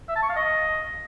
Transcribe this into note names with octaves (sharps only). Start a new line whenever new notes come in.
E5
A5
C#6
F5
D#5